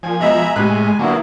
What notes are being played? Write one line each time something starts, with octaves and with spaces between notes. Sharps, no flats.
A#2 F3 G#5
B2 G#3 D#5 E5 A#5 B5
A2 C3 G#3 G#5 B5 F#6
D3 F#3 A#3 B3 E4